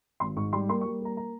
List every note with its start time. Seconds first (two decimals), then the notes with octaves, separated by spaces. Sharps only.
0.20 G#1 C6
0.36 G#2 C#6
0.53 G3 C6
0.69 A#3 C6
0.81 C#6
0.85 G3
1.01 A#3 A#5
1.17 A#5